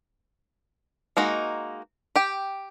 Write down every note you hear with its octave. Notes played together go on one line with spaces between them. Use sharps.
G#3 A#3 D#4 F#4
G4 G5